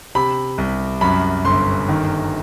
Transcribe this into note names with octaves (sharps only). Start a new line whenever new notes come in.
C3 B5
C2
F#2 B5
G1 C6
D#3